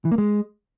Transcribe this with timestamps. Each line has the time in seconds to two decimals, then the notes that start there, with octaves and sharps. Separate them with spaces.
0.05 E3
0.12 A#3
0.18 G#3